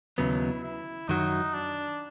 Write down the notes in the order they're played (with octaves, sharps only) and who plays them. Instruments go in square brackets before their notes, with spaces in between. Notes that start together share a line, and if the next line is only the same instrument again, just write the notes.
[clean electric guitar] D#2 C#3 F#3 B3 [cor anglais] E4
[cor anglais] E4
[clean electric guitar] F#2 D#3 F#3 [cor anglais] D#4
[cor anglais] D4